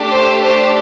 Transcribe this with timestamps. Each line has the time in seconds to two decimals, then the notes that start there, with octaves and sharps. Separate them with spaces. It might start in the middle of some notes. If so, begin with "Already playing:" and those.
Already playing: A3 D4 G4
0.11 C5
0.42 C5